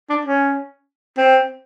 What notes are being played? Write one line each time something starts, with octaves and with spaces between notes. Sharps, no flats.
D4
C#4
C4